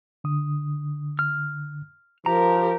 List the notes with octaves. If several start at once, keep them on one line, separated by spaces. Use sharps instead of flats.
D3 D#6
F6
F3 G4 A#4 A#5